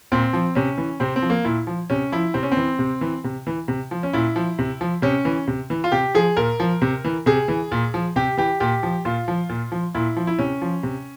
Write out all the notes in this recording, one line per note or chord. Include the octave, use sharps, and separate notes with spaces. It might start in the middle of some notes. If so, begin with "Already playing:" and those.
A#2 C4
F3
C3 C#4
E3
C3 C4
C4
F3
A#3
A#2 E4
F3
C3 C#4
F3 E4
C3 C4
C#4
C4
E3
C3
E3
C3
E3
C3
F3
C#4
A#2 E4
F3
C3
F3
C3 C#4
E3
C3
E3
F4
C3 G4
F3 G#4
A#2 A#4
F3
C3
E3
C3 G#4
E3
A#2
F3
C3 G4
E3 G4
A#2 G4
F3
A#2 F4
F3
A#2
F3
A#2 E4
F3
E4
C3 C#4
F3
C3